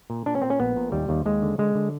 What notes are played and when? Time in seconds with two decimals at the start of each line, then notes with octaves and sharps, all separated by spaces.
0.10 A#2
0.26 A#2 D4
0.35 C#4
0.42 A#2 C4
0.50 C#4
0.60 A#1 B3
0.76 A#2
0.92 D#2 G3
1.09 D#2
1.25 D#2 G#3
1.42 D3
1.58 D3 G#3
1.75 D3